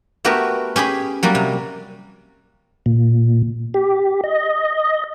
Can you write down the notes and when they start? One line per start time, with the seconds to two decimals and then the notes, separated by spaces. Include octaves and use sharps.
0.25 A3 B3 F#4 G4 A#4
0.76 C#4 G4 G#4 B5
1.23 F#3 G3 A#3 F#4
1.35 C3
2.86 A#2
3.74 G4
4.24 D#5